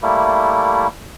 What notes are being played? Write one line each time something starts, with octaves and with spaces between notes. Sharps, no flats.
G3 A3 A#3 E4